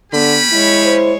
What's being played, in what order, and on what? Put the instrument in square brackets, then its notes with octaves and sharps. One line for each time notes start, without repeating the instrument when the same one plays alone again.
[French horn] D3 [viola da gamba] B3 [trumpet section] C#4 G4 B5
[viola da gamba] G#3 C#5 [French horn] E4
[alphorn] C5